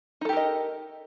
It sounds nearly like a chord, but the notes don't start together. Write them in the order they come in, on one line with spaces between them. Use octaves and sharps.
D#4 A4 G4 A#4 D#5